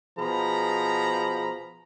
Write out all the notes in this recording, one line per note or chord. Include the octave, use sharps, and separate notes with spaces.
B2 F3 G#4 A#5 B5